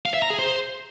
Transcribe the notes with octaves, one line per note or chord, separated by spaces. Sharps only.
F5
E5
A#5
G#4
C5